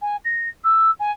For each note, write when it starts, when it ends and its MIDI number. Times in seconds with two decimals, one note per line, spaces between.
0.01 0.16 80
0.25 0.49 94
0.64 0.91 88
0.99 1.11 80